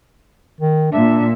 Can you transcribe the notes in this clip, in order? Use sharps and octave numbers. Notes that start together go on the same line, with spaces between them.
D#3
A#2 D4 E5